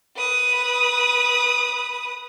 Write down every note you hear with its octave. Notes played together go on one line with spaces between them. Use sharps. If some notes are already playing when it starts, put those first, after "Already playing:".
B4 D#6